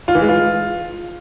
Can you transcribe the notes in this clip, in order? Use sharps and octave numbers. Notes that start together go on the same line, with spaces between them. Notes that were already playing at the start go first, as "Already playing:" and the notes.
F4
E3
G#3
F4